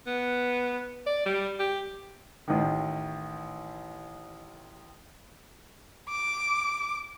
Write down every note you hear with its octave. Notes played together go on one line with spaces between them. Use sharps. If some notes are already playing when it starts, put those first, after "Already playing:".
B3
D5
G3
G4
A1 D#3
D6